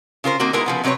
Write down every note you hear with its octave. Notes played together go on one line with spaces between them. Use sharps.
C#3 F4 A#4 C5
D#3 A#3 C4 F#4
G#3 A3 B3 D#4 E4 A#4
C#3 F3 B3
C3 F#3 C4 B4 C#5